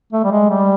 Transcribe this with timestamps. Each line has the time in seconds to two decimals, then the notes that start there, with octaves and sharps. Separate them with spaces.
0.13 A3
0.24 G3
0.31 G#3
0.50 G3